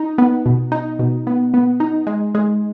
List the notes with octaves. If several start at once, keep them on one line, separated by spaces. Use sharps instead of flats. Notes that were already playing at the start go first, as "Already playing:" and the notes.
Already playing: D#4
B3
B2
D#4
B2
B3
B3
D#4
G#3
G#3